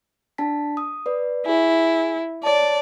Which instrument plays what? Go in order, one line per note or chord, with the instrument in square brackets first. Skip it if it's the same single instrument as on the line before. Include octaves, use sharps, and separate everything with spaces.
[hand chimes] D4 A5 B6
D#6
B4 D5
[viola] E4 [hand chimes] G#4 G#5
[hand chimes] C#5 A5 [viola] D5